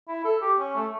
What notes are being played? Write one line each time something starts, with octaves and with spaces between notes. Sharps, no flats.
E4
A4
G4
C#4
A3